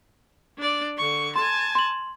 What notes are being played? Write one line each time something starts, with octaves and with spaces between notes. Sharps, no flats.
D4 D5
D3 C#6
G#5 A5 C6
C6 F#7